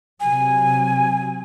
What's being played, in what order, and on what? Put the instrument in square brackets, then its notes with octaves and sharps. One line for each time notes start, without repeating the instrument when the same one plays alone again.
[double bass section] C3 F#3 [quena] G#5